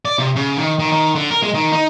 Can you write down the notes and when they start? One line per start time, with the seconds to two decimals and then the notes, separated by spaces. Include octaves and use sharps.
0.05 D5
0.19 C3
0.36 C#3
0.57 D#3
0.79 D#3
0.92 D#3
1.15 D3
1.31 A#4
1.42 G#3
1.54 D#3
1.72 D#4